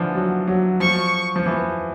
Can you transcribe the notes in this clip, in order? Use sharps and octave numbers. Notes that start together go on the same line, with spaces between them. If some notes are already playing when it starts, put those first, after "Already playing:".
Already playing: D3 E3 F3
F#3
F#3
F3 C#6
F3
E3